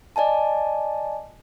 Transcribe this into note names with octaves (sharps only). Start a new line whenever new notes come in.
D5 D#5 G#5 A5